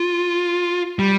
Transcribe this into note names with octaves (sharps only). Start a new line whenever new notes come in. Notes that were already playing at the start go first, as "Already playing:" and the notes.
Already playing: F4
G3